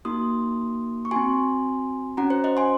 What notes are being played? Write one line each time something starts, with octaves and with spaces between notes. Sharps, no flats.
A#3 D#4 F#4 C6 D#6
C#6
C4 F#4 G#5 C6
C#4 F#4 F#5 A#5
C5
C5 D#5
G#5 C6